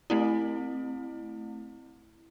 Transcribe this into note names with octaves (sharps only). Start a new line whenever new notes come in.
A3 C4 E4